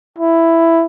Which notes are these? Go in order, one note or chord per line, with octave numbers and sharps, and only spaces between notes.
E4